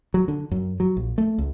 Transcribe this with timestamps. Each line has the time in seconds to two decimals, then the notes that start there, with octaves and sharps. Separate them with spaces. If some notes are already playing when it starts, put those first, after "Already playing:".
0.14 F#3
0.28 D3
0.51 F#2
0.80 F#3
0.97 A#1
1.18 A3
1.38 C#2